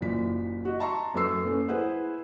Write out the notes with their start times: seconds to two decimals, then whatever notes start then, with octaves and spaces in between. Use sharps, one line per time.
0.01 F#1 F#2 A#2 E3 B6
0.65 F#4 D#5
0.79 E5 A5 A#5 C6 C#6
1.14 F#2 A3 B4 C#6 E6 C7
1.45 A3 A#3 C#4 A4 B4
1.68 E4 G#4 B4 C5 F#5